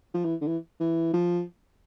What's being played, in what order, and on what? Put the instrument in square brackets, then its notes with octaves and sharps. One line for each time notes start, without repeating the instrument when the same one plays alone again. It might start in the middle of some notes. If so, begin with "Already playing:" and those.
[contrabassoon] F3
E3
D3
E3
E3
F3